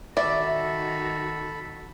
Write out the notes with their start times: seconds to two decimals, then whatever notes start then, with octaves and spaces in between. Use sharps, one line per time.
0.17 D#3 F#4 A4 D5 E5 B5